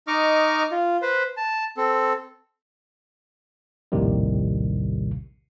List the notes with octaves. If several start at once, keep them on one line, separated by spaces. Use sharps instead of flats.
D#4 D#5 C#6 D6 F6
F4
B4 C5
A5
C4 A4
A#1 D#2 A2 C3 D#3 G3